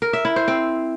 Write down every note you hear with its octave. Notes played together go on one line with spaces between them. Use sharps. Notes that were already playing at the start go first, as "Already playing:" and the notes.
A#4
E5
E4
C5
C4